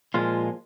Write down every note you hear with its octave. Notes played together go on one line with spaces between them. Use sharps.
A#2 F3 G#3 F4